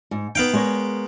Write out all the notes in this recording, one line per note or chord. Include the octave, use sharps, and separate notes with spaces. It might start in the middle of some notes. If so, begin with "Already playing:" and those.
G#2
B3 D#4 F5 G5
G#3 A#4 C#5